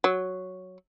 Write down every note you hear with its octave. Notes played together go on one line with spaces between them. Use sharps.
F#3